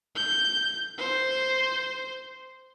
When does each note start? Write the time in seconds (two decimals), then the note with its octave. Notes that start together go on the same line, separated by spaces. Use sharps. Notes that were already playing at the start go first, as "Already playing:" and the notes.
0.16 G6
0.98 C5